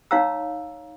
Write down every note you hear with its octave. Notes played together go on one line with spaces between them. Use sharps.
D#4 C#5 F5 A#5 E6